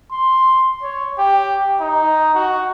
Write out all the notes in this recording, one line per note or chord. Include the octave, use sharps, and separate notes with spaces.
C6
C#5
G4
D#4
F#4